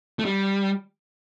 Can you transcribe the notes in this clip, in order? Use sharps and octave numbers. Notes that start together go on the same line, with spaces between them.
A3
G3